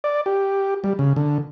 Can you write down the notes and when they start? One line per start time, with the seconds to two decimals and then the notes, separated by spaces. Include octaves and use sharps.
0.04 D5
0.26 G4
0.84 G3
0.99 C#3
1.16 D3